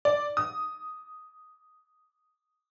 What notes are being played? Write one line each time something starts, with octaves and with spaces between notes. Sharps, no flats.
D5
D#6